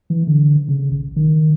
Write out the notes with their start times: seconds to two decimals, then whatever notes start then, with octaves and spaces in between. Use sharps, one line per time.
0.10 E3
0.27 D3
0.68 C#3
0.91 A1
1.16 D#3